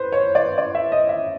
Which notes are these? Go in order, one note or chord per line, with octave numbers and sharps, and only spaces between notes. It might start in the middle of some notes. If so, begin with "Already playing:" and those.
Already playing: B4 C5
C#5
D5
D5
E5
D#5
E5